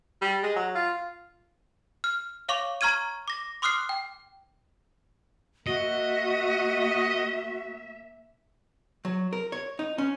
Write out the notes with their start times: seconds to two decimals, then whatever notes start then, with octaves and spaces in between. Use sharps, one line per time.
0.21 G3
0.43 G#3
0.56 F#3
0.75 F4
2.04 F6
2.49 C#5 F5 C#6 D6 F7
2.81 A#5 C#6 F6 G#6 D#7
3.28 D6 A#6
3.62 C6 D6 D#6 F6 F#6 C7
3.89 G5
5.67 A#3 F#4 D#5 E5
9.05 F#3
9.33 A#4
9.52 C#5
9.79 D#4
9.98 C#4